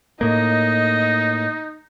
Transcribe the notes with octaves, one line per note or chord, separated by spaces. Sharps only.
A2 A#3 D#4 D#5